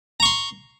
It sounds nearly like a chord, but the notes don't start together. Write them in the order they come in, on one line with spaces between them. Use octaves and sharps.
A#5 C#6 C6